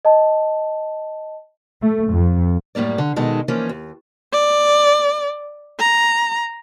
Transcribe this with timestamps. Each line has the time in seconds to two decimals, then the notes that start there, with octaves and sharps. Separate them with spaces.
0.05 D#5 A5
1.82 A3
2.11 F2
2.75 F#2 A2 G3 A#3 D5
2.98 D3
3.16 B2 D#3 G#3 D#4 A4
3.48 E3 F3 A#3 C#4
3.69 D#2
4.33 D5
5.80 A#5